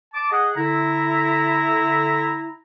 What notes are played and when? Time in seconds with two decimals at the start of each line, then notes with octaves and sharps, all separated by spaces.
0.14 A5 D6
0.31 G#4 D#5 F#5
0.56 D3 E4 A#5